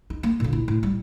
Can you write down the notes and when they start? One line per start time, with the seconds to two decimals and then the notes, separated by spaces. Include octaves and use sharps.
0.10 D#4
0.23 A#3
0.40 A#2 D3
0.53 E4
0.68 A2
0.83 G3